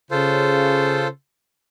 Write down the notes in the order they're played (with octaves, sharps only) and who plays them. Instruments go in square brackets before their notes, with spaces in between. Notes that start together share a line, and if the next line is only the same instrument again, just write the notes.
[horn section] C#3 [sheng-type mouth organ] F4 A4 C5